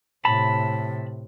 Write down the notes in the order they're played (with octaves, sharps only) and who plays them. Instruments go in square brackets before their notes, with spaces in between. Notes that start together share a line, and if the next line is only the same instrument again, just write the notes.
[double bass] A2 C3 [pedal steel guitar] A5 B5